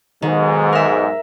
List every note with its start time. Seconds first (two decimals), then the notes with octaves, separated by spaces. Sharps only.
0.22 B1 G#2 D#3
0.73 A#4 E5